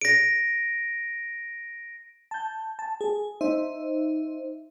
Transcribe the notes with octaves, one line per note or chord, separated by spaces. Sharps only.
A#6 D7
A5 G6
A5
G#4
D#4 C5 E5